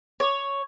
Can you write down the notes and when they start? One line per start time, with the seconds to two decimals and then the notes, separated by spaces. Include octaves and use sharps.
0.20 C#5